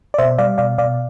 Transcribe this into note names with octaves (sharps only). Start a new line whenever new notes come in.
D5
B2 C5 E5
G3 D5 F5
B2 D5 F5
B2 D5 F5